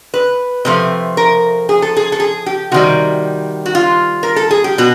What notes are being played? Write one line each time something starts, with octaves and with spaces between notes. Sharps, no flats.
B4
C3 F3 A3
A#4
G#4
A4
G#4
A4
G#4
G4
C3 D#3 G3 F#4
F#4
F4
A#4
A4
G#4
G4
B2 F#4